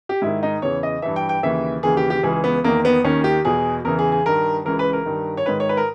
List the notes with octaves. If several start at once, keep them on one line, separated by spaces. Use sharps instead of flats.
G4
G#2 D#3 E4
D#4
E2 C#3 E3 C#5
D#5
G2 E3 E5
G5
G5
D#2 C#3 E3 E5
D#2 C#3 E3 G#4
G4
G4
C#2 C#3 E3 G#4
B3
E2 D#3 A#3
B3
D#2 D#3 C#4
G4
E2 B2 G#4
E2 C#3 E3 A#4
G#4
G#4
G2 D#3 A#4
C#2 C#3 E3 A#4
B4
A#4
G2 D#3
C#5
G#2 D#3 B4
C#5
B4
A#4